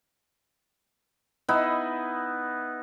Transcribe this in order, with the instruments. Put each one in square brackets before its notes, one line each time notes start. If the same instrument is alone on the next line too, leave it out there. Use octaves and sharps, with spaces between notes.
[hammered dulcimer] B3 D#4 E4